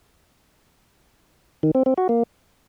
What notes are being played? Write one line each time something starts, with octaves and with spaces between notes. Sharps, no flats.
D#3
C4
C4
F#4
A#3